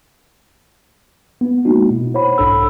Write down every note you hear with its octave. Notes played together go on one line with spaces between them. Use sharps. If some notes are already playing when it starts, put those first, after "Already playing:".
B3
G#3 A#3 D4 D#4 F#4
B2 E4
C5 C#5 F#5 B5
B1 G#2 D4 A4 B5 E6